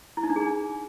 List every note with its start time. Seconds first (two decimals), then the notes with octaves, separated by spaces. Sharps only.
0.17 E4
0.23 D#4
0.30 D4
0.36 G#4
0.42 D4